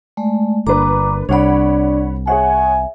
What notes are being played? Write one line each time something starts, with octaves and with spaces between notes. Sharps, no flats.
G#3 A3 D5
G1 A#3 D4 B4 A#5 D6
C2 D4 C#5 D5 F#5 B5
G#4 C#5 E5 F#5 G#5